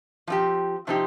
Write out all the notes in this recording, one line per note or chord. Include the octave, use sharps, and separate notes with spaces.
F3 C4 G4
C3 F3 C4 D#4 G4